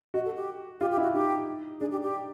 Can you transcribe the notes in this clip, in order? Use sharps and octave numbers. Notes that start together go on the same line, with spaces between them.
F#4 D#5
A4
G4
F4 G4
G4
E4
F#4
D#4 G4
D4 G#4
G4
G4